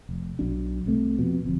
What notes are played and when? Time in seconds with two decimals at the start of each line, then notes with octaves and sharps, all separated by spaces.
0.09 F1
0.39 B1 F#3 D4
0.86 C2 C3 A3
1.18 F2 B2
1.45 G1 F2